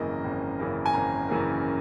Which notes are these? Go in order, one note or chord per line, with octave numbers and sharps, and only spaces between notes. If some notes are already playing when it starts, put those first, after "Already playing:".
Already playing: G#1 F#2 C#3 E3 A#3 D#5
G#1
F#2 C#3 E3 A#3
G#5
G#1 A#5
F#2 C#3 E3 A#3